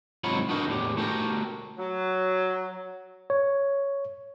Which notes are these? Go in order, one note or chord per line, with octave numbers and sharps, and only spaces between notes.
G#2 C3 F#3 F4 C#5 B5
B3 D4 D#4 F#4 G4 A#4
E2 A2 G4
A3 F#4 G4 A#4
F#3
C#5